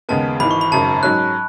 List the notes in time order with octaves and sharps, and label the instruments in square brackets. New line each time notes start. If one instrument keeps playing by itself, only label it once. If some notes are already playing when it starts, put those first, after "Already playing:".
[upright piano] D#2 C#3 G#3 B3 [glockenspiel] A5
[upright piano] G#1 G#2 E3 [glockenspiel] B5
[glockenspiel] C#6
B5
[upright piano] G#1 F#2 C#3 [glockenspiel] A5
[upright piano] G#2 F#3 C#4 [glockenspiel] F#6